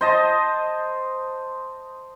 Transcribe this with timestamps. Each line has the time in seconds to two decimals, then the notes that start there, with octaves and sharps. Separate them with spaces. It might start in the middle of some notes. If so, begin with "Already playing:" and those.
0.01 C5 D#5 A5